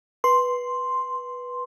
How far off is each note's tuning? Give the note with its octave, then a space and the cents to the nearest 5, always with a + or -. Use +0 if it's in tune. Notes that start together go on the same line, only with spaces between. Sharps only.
B4 -10 C6 +0